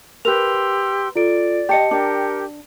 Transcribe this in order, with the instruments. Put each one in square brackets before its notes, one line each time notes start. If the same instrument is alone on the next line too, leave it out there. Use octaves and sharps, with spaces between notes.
[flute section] G4 C6 E6 [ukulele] A#4 B4 [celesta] F7
[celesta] F4 A4 D7 [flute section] D5
[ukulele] G4 D#5 [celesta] G5 A5 C#7
[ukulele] D4 [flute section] G4 A#4